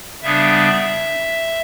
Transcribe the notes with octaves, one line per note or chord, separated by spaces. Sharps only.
C#3 G3 B3 D4 E5